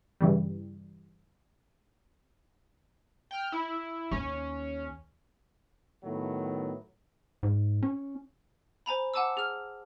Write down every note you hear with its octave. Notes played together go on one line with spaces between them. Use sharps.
G2 C#3 E3 G3
G5 F6
E4
D#2 C#4
A2 D#3 F#3 A3 B3
G#2
C#4
C5 G#5 A#5 B5
F#5 G#5 A5 D6 E6
G#4 F6